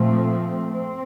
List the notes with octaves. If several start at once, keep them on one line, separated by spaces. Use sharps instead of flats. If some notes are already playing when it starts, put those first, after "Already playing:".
Already playing: A#2 F3 A3 C4
C4